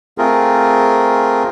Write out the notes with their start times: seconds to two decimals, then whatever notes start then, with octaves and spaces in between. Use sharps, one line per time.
0.18 A3 C4 F4 G#4 A#4